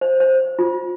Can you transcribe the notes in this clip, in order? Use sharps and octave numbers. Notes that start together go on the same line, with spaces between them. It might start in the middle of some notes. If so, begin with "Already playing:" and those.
C5
C5
F4